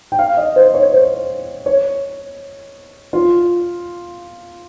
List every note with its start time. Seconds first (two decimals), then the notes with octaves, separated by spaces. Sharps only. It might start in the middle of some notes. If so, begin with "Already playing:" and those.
0.12 G5
0.19 F5
0.37 D#5
0.56 C5
0.74 C#5
0.93 C5
1.66 C#5
3.13 F4